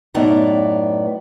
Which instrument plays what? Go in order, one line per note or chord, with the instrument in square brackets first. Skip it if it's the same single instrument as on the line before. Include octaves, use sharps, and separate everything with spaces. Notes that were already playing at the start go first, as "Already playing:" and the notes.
[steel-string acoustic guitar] F#2 A2 B3 D#4 D5 A#5